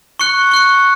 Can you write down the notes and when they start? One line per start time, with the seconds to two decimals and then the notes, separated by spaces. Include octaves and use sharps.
0.19 C#6 F#6 C#7
0.51 C#6 F#6 C#7